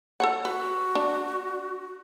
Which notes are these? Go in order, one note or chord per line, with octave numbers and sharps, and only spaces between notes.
A4 C#5 F#5
F#4 B4
D4